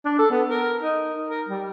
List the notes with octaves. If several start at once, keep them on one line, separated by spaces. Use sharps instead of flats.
D4
A4
B3
A#4
D#4
A#4
G3